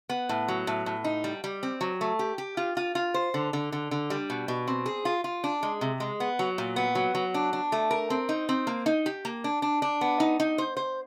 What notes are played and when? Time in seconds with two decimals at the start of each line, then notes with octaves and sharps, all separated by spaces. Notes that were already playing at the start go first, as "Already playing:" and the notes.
0.09 B3
0.29 A2
0.48 F#3
0.67 A2
0.86 A2
1.04 D#4
1.24 G3
1.44 G3
1.63 C4
1.81 F#3
2.01 A3
2.19 G4
2.38 G4
2.57 F4
2.77 F4
2.95 F4
3.14 C5
3.34 D3
3.53 D3
3.72 D3
3.91 D3
4.10 G3
4.30 B2
4.48 B2
4.68 C4
4.86 G#4
5.05 F4
5.24 F4
5.44 D4
5.63 G#3
5.81 C3
6.00 G#3
6.20 B3
6.39 F#3
6.58 A#2
6.76 B3
6.95 F#3
7.15 F#3
7.34 D4
7.53 D4
7.72 A3
7.91 A#4
8.10 C4
8.29 D#4
8.49 C4
8.67 A#3
8.86 D#4
9.06 G4
9.25 A#3
9.44 D4
9.62 D4
9.82 D4
10.01 B3
10.20 D#4
10.40 D#4
10.58 C5
10.77 C5